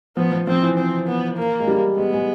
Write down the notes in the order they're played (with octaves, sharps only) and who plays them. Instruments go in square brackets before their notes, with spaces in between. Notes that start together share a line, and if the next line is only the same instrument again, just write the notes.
[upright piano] F3 [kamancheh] B3
[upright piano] F3
[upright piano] F3 [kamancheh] C4
[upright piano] E3
[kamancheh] C4
B3
A#3
[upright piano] G#3
G3
[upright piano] G#3 [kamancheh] B3
[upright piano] G#3